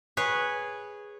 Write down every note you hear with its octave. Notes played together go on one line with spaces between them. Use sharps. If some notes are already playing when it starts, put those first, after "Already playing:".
G#4 B4 C#5